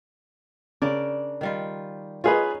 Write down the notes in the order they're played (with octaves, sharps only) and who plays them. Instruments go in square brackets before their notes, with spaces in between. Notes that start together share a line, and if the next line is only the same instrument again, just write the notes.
[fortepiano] C#3 [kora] D4 A#4 D5
[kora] D#3 G3 F4
[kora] C#4 D#4 [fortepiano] F4 G#4 B4